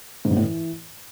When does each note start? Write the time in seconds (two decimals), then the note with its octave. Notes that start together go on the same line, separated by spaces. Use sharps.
0.25 G#2
0.31 G2
0.37 A2
0.43 E3